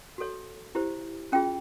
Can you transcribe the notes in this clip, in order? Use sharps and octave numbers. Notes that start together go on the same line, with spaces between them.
F#4 A4 C#5
E4 G4 C5
C#4 F4 G#4 G5